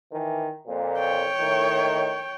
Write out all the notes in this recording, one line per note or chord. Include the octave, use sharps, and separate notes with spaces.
D#3 E3
F2 A#2
C#5 G5
A2 D#3